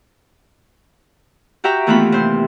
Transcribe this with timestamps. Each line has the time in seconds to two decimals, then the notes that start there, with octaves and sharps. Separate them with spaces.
1.64 F#4 G4 E5 G5 A#5
1.87 D#2 E3 A3 B3 F4 B5
2.12 C3 C5